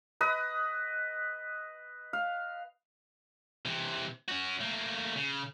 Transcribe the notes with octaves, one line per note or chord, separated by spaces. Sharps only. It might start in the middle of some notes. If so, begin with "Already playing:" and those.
B4 D#5
F5
C3 E3
C#4 F#4
A3 A#3
C#3